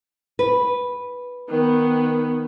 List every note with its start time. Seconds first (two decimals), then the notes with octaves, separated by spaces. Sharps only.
0.39 B4
1.49 D#3 B3